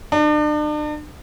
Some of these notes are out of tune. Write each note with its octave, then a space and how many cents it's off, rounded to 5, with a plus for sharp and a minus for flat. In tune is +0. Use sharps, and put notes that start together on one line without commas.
D4 +40